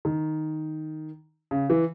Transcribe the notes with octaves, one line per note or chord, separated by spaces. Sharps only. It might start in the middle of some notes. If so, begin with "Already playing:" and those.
D#3
C#3
E3